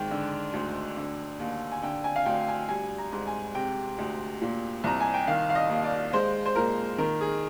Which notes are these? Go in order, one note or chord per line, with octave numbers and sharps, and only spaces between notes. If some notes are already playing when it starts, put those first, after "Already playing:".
Already playing: G#2 D#3 G5
D3
D2
D3
D#2
G#5
D3 G5
G#5
F5
D2 G5
G#5
G3 G#5
A#5
G#2
G#5
C3 G5
D2
A#2
C2 A#5
G#5
G5
D#3 F5
F5
D#5
D#2
D5
G#3 C5
C5
A#2 A#4
D#3 A#4
G#4